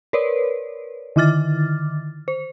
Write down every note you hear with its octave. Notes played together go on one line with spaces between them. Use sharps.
A#4 B4 C#5 D5
D3 D#3 D6 F6 A6
C5